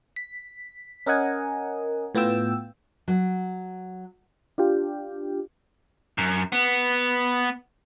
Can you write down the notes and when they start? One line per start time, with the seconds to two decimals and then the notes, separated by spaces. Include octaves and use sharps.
0.16 B6
1.06 C#4 A#4 D#5 F#5 G#5
2.15 A2 B3 F4 G5 E6
3.08 F#3
4.58 D4 F4 G4
6.18 F#2
6.52 B3